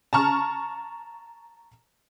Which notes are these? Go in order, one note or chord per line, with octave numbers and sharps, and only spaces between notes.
A5 A#5 C#6 F6